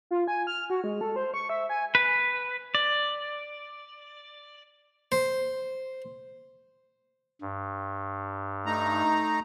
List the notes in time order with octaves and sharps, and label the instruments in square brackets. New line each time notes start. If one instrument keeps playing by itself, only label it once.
[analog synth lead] F4
G#5
F6
F#4
G#3
A4
C5
C#6
E5
G#5
[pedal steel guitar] B4
D5
[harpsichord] C5
[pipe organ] G2
[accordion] A3 D#4 A#5